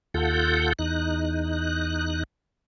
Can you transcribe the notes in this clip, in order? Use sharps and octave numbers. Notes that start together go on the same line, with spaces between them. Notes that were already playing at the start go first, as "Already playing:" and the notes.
D#2 F4 A4 F#5 G6
E2 D#4 F#6